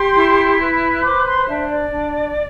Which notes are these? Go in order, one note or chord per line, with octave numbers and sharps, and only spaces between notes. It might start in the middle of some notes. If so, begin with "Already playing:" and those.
Already playing: G4 C6
E4
B4
C5 D6
C6
D4 E5
D5
D4